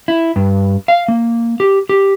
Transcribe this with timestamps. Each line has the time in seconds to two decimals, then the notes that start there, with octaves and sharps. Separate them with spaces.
0.08 E4
0.36 G2
0.88 F5
1.08 A#3
1.60 G4
1.89 G4